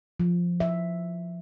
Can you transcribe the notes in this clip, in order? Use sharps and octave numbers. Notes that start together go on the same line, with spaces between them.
F3
E5